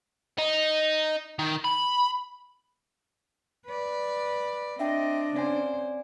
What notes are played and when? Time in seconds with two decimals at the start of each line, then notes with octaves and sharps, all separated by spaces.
0.39 D#4
1.39 D#3
1.64 B5
3.66 B4 D5
4.79 C4 D4 D#5 E5 G5
5.35 C#3 C4 C5 D5 G#5